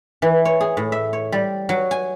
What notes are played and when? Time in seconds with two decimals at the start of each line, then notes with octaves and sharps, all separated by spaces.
0.22 E3
0.45 C#5
0.61 G#4
0.77 A2
0.92 E5
1.13 C#5
1.32 G3
1.69 F#3
1.91 G#5